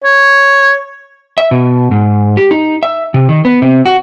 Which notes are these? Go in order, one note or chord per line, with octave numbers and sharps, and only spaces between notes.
C#5
E5
B2
G#2
G4
D#4
E5
C3
D#3
B3
C3
F#4